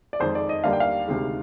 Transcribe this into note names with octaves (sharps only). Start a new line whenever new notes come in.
D5
F2 D#3 G#3 C5
D5
D#5
D#2 D3 G3 A#3 F5
G5
F5
D2 C3 D#3 G#3